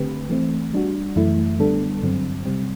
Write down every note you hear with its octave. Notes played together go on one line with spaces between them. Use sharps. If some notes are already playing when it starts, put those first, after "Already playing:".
Already playing: D3 A3 C4 G4 B4
E3 A3 C4
G3 D4 F#4
F#2 E3 A3 E4
D3 G3 B3 D4 A4
G2 D3 F#3 C4
C3 G3 C4